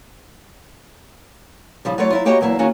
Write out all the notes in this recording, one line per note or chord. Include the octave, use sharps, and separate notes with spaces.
C#3 F3 G3
F#3 G3 A3 F4 C#5 D5
F#3 E4 F4
A#3 F#4 G4 C#5 D#5 A#5
E2 F#3 A#3 E4 A5
D#3 A#3 C#4 F4 F#4 G#4